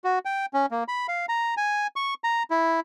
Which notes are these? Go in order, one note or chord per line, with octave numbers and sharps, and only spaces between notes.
F#4
G5
C#4
A#3
B5
F5
A#5
G#5
C#6
A#5
E4